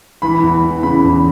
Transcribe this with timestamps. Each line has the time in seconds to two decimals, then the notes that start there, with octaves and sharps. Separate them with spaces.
0.22 E3 B5
0.43 E2
0.64 E3
0.83 C#3 B5
1.04 E2